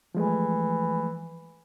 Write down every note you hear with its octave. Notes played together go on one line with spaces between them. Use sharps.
E3 F3 G#3 A3